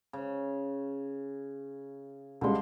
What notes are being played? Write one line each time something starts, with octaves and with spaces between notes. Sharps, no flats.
C#3
C#2 D3 G3 G#3 C6